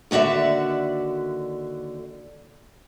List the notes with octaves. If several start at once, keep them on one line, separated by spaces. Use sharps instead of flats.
D#2 D3 F#4 D5 E5